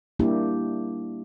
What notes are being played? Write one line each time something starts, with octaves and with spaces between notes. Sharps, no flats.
G3 A#3 D4 E4 G4